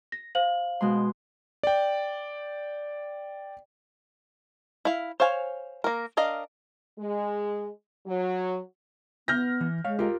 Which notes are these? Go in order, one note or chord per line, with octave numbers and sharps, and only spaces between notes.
A#6
C5 F5 F#7
B2 G#3 C6
D5 G5
E4 F5
C5 C#5 F5 G#5
A#3 A#4
D4 A#4 D#5 F5
G#3
F#3
B3 F6 G6 A#6
E3
G#3 C#5 F5
F4 G4 A#4